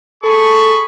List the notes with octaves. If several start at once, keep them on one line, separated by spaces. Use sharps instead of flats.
G#4 A4 B5 C#6